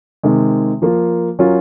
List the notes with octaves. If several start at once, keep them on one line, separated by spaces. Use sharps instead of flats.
C3 D#3 G#3
F3 A#3 F4
F#3 C#4 F4 A#4